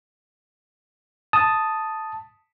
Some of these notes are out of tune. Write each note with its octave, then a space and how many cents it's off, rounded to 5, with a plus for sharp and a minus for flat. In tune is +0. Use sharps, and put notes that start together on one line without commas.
A5 +0 D#6 +0